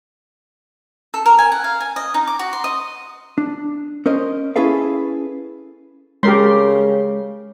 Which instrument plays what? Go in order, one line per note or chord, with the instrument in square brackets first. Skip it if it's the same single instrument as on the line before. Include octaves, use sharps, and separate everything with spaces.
[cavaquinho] A4
A#4
G#5
F#5
F5
G#5
D#5
D#4
D6
F#4
C6
D#5
[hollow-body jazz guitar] D4
C#4 A#4 C5 D#5
C#4 E4 G#4 A4 B4 F5
[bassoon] C#3 [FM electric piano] G#3 [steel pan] G4 A#4 C6